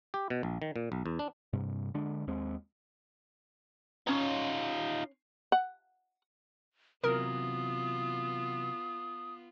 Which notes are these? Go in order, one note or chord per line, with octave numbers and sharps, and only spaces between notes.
G4
B2
A#1
D#3
A#2
B1
E2
D4
G2 C3
D3 G#3 D4
D#2 G#3 C4
C#4 D#4 F4 C#5
F#5
C3 E3 F#3 B3 F4 A#4 D#6